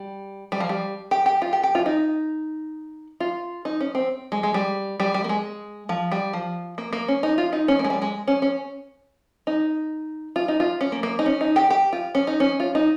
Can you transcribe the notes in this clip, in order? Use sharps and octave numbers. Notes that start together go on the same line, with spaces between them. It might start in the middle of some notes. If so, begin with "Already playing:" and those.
Already playing: G3
G3
F3
G3
G4
G4
F4
G4
G4
F4
D#4
F4
D#4
C#4
C4
G#3
G#3
G3
G3
G3
A#3
G#3
F3
G3
F3
A#3
A#3
C#4
D#4
F4
D#4
C#4
A#3
G#3
G3
G#3
C#4
C#4
D#4
F4
D#4
F4
C#4
A#3
A#3
D#4
C#4
D#4
G4
G4
F4
C#4
D#4
C#4
F4
D#4